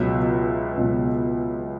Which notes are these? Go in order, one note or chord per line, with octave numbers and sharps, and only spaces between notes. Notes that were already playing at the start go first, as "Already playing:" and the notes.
Already playing: C#2 B2 F#3 E5
C#2 B2 F#3